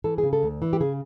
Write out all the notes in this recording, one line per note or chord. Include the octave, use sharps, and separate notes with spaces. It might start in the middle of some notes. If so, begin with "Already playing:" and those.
E3 A4
G#4
C#3
A4
D2
E3
G4
C#3 G#4